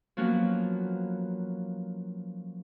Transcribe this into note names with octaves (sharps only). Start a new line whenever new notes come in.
F3 F#3 A#3 B3 C#4 F#4